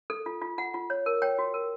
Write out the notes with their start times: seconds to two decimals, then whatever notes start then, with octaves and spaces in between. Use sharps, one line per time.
0.10 A4
0.26 F4
0.42 F4
0.58 F4 F#5
0.74 F4
0.90 C#5
1.06 A#4
1.22 C#5 G5
1.39 F#4
1.54 A#4